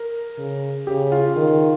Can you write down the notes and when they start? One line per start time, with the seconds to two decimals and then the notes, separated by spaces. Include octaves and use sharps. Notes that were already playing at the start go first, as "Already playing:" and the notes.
Already playing: A#4
0.38 C#3
0.87 C#3 G4
1.12 F4
1.37 D#3